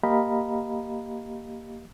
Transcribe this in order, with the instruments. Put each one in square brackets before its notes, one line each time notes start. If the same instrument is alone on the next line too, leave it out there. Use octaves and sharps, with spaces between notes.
[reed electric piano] A#3 G4 D#5 F5 A#5 B5